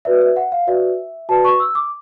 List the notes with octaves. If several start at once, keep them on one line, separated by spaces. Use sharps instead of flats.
F#4 B4 D5 E5
E5
F#5
F5
F#4 B4 D5 E5
F#4 B4 D5 A5
C#6
E6
D6